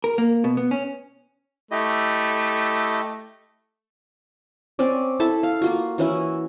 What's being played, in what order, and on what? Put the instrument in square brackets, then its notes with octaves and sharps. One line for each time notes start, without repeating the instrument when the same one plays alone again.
[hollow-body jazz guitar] A#4
A#3
B2
B3
C#4
[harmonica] A3 [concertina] E4 G4 D#5
[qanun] C4 C#4 D5
E4 A4 A5 B5
F5
A#3 F4 F#4
E3 C#4 E4 F#4